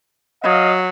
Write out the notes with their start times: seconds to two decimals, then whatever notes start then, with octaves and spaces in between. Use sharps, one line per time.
0.43 F#3 D#5 F5